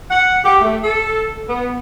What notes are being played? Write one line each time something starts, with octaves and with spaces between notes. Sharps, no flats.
F#5
G4
A3
A4
B3